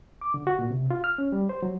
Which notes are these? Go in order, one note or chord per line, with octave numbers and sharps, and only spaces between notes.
D6
D3
F#4
A#2
C3
F4
F6
C#4
G3
C5
F#3